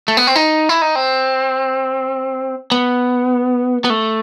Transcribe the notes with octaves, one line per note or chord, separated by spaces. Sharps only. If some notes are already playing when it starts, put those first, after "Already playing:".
A3
B3
C4
D#4
E4
D#4
C4
B3
B3
A3